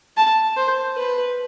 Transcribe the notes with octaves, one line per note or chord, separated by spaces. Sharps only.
A5
C5
B4